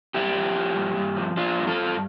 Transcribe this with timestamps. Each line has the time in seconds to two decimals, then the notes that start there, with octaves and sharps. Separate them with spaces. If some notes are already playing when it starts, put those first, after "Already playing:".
0.14 G2 E4 G4
0.35 F3
0.56 F3
0.76 G2
0.96 G2
1.17 F3
1.37 F3 D4 F4
1.57 G2
1.67 F4 A4
1.78 G2